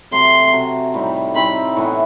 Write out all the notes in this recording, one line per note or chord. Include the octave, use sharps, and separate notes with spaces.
C3 F#3 A3 C4 C6
C3 F#3 A3 C4
A2 G3 C4 D#4
A2 G3 C4 D#4 B5
A2 E3 B3